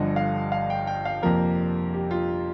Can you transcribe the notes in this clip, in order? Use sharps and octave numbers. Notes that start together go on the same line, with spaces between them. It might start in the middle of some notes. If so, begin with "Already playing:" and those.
Already playing: G1 G2 D3 F3 D#5
F5
F5
G5
G5
F5
F2 C3 F3 A#3 A#4
G4
F4